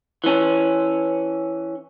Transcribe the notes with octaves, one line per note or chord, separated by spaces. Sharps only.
E3 C#4